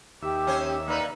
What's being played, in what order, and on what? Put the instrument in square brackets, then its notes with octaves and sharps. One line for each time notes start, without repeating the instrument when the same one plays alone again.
[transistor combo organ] D#2 E5 [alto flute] G4 [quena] D6
[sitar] C#4 C5 C#5
[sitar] A#3 D#4 B4 [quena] D5